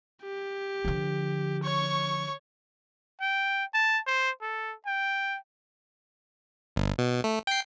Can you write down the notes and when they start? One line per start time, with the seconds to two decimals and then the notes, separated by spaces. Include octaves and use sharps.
0.22 G4
0.85 D3 F3
1.63 C#5 C#6
3.21 G5
3.74 A5
4.07 C5
4.42 A4
4.86 G5
6.76 G1
6.98 B2
7.24 A3
7.47 G5 C7